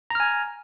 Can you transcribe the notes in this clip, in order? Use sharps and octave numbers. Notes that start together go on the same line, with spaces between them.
G#5 A#5 F6